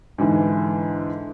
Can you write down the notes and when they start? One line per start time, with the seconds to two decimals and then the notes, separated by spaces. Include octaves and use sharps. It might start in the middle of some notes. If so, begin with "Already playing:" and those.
0.18 G#2 D3 E3